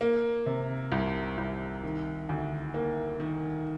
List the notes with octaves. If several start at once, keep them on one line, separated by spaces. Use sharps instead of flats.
A#3
C3
C2
C2
D#3
D2
A#3
D#3